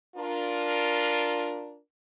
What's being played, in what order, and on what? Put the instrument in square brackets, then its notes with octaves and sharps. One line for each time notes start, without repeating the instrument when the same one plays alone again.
[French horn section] D4 F4 A#4